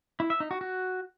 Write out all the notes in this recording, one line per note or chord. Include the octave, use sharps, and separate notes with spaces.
E4
E5
D#4
F#4
F#4